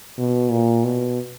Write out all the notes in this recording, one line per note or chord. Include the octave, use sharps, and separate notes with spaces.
B2
A#2
B2